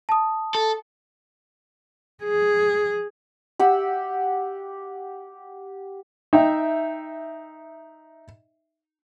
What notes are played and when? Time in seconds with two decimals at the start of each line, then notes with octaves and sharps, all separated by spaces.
0.09 A5 D#6
0.55 A4
2.23 G#4
3.59 G4 F#5 E6
6.33 D#4 E5 G5